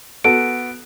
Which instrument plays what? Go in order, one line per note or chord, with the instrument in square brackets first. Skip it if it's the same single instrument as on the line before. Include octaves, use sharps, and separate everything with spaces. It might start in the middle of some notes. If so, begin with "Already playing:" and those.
[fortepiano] B3 F#4 A4 [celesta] D7